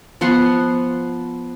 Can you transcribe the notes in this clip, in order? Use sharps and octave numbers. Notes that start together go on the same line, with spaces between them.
F3 B3 F#5 C6